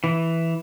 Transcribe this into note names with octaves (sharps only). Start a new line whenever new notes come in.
E3